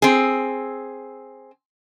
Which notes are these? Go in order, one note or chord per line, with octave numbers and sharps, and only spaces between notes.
C4 G#4